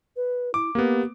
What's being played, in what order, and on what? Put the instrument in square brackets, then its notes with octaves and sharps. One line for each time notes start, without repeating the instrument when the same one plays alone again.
[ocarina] B4
[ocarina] E4 [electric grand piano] D6
[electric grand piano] A#3 B3 [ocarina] G4